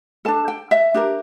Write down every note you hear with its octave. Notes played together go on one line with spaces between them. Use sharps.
D4 A4 A5
G5
E5
D4 G4 A#4